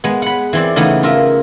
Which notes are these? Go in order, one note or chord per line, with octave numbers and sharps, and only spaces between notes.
G#3 B3
F#5 B5
E3 C4 D5
C#3 E3 A3 B3 D#4
F4 A#4 E5